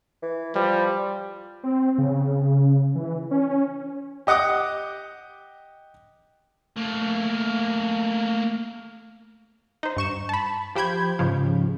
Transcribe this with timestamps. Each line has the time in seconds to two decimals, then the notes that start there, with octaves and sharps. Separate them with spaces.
0.22 E3
0.55 F3 G3
1.64 C4
1.98 C#3
2.95 E3
3.31 C#4
4.27 G4 D#5 F#5 D6 D#6
6.76 A3 A#3
9.83 D#4 C5
9.97 G2 C#6 E7
10.29 A5 B5
10.75 F3 G4 C5 B5 G6 G#6
11.19 G#2 C#3 F3